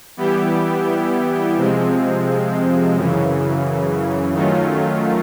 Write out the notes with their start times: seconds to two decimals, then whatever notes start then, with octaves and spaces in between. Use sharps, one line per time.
0.17 E3 G3 B3 E4 G4
1.56 C3 F3 G#3 C4
2.94 F#2 C#3 E3
4.33 D#3 F#3 A3 C#4 F4